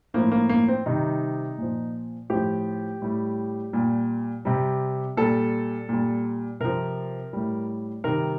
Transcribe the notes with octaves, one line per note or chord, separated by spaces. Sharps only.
A2 F3 A#3
A#3
A#3
C4
C3 D#3 G3 D#4
A#2 F3
A2 F3 G4
A2 G3
A#2 G3
C3 G3
A#2 G3 A4
A#2 G3
C3 F3 A#4
A2 G3
C3 D#3 G3 A#4